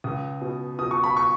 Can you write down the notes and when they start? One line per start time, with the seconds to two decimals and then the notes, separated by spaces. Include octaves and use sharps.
0.04 C#2 D#6
0.41 B2
0.79 B2 D#6
0.91 C#6
1.04 B5
1.17 C#6